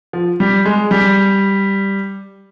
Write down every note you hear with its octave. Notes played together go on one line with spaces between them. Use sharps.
F3
G3
G#3
G3